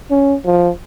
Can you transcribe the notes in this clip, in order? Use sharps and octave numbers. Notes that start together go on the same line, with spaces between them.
C#4
F3